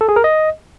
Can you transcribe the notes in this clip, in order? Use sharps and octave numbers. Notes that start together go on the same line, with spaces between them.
A4
G#4
A#4
D#5